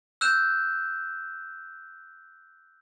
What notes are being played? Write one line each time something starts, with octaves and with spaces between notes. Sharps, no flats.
E6 F#6 G6 E7